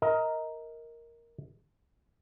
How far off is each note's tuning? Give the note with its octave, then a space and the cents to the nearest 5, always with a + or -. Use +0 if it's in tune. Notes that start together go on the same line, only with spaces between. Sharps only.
A#4 +0 D#5 +25